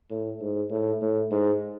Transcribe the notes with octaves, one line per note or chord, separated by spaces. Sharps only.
A2
G#2
A2
A2
G#2